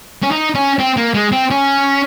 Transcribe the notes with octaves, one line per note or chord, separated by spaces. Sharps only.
C#4
D#4
C#4
C4
A#3
G#3
C4
C#4